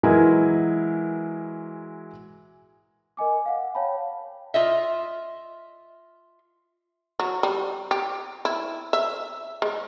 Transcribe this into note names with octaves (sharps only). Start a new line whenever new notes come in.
E3 F#3 G#3 E4 G#4 A#4
A#4 D#5 G#5 D6
F5 F#5
C#5 F5 G5 A5 B5
F4 D#5 E5
F#3
G3
G4
E4
E5
G#3